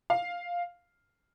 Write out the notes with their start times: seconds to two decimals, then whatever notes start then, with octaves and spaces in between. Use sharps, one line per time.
0.10 F5